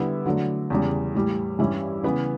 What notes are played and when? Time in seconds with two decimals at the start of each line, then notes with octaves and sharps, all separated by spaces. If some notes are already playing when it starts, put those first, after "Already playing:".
Already playing: D3 G3 B3 E4
0.25 D3 F#3 A3
0.70 E2 C#3 G3
1.15 A2 E3 G3
1.59 G2 E3 G3 C#4 E4
2.04 C#3 E3 B3